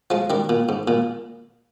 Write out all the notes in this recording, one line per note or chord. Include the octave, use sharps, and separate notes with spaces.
F3 G#3
D#3 G3
A#2
G#2
A#2